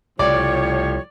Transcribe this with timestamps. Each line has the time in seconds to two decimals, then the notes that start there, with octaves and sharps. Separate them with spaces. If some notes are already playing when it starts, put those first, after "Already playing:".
0.19 C2 A2 C#3 F3 G3 C#5 D5